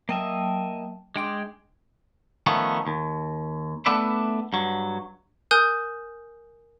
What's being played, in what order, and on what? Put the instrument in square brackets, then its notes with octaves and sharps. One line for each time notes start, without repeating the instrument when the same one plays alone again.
[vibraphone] F#3 G5 A5 [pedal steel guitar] A#3 D#5 E5
[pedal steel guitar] G#3 G5 [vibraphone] D4 C6 D6
[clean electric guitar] D#3 F3 A3 B3 C#4
D#2
A3 B3 D4 B4 D5 E5
G2 F#3
[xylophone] A#4 G#5 D#6 F#6 G6